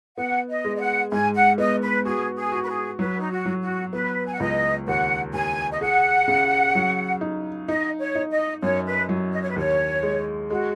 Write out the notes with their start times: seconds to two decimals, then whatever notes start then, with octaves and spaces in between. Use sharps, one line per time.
0.17 B3 F#5
0.49 D#5
0.65 G#3
0.76 D#5
0.80 F#5
1.12 G#2 G#5
1.34 F#5
1.58 B3 D#5
1.82 B4
2.05 F#4 G#4
2.36 G#4
2.52 F#4
2.63 B4
2.68 G#4
2.99 F#3 B4
3.19 D#4
3.31 F#4
3.46 F#3
3.62 F#4
3.93 B3 B4
4.25 G#5
4.33 F#5
4.40 C#2 D#5
4.87 D#2 F#5
5.34 D#2 G#5
5.71 D#5
5.81 G#4 F#5
6.28 C#3
6.75 F#3
7.21 D#4
7.68 D#4 D#5
7.99 C#5
8.15 D#4
8.31 D#5
8.62 F#2 C#5
8.85 B4
9.09 F#3
9.32 D#5
9.42 C#5
9.49 B4
9.56 D#2 C#5
10.03 G#3
10.50 G#3 F#4